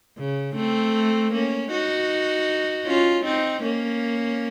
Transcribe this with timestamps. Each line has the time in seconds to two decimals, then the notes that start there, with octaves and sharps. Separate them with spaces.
0.18 C#3
0.56 A3 C4
1.33 A#3 C#4
1.71 D#4 F#4
2.86 C#4 F4
3.24 C4 D#4
3.62 A#3 C#4